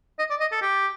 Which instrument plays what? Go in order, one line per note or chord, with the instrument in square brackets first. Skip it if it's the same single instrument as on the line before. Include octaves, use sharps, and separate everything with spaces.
[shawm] D#5
D5
D#5
A4
G4